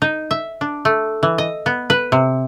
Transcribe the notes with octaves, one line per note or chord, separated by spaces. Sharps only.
D#4
E5
D4
A3
E3
D#5
B3
B4
C3